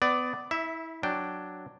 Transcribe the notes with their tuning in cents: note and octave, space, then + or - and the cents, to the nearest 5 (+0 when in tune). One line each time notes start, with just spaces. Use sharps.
B3 +25 D5 +0
E4 -25 E5 +0
F#3 +0 D4 +0 G5 +0